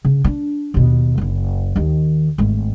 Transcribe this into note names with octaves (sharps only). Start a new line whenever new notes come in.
C#3
D4
D#2 B2
F#1 E4
D#2 D#3
G#1 A3